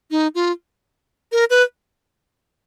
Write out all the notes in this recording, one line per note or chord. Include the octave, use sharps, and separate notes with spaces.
D#4
F4
A#4
B4